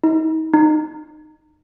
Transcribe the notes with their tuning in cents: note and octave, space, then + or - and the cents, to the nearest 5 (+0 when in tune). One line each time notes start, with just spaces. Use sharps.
D#4 +40
D#4 -25